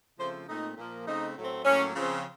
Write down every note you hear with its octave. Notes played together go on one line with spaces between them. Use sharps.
C#3 F3 A3 C4 C5
A#2 A3 C4 D#4
A#2 F3 A#3
C#3 A3 C4 D#4
A2 F#3 A3 C4
A2 F#3 A#3 C#4
C#3 F3 C4